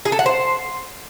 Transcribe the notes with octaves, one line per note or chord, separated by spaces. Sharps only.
G#4
A4
F#5
C5